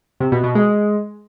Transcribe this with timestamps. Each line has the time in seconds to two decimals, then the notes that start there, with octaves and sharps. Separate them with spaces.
0.20 C3
0.32 B2
0.44 B2
0.55 G#3